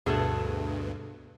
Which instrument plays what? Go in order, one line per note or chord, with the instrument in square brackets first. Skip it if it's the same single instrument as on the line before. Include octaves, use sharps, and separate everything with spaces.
[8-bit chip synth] D2 G2 [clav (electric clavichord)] B2 B3 E5 [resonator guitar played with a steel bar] G#4 A4 A5